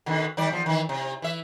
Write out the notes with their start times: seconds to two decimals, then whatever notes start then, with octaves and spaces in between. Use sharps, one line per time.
0.06 B2 D3 D#3
0.37 D#3 G3 D5
0.51 E2 F3
0.66 D#3 E3
0.89 C3
1.22 E3 E5